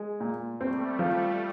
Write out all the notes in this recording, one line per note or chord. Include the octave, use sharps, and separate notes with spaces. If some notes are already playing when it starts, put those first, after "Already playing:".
Already playing: G#3
A#2
G3 A3 C4
F3